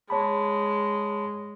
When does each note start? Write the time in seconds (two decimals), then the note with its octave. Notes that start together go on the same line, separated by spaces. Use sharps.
0.10 G#3 C#5 A5 B5